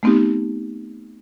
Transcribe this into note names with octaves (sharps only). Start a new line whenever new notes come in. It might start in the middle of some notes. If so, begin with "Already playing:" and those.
A3 B3 C4 D#4 G4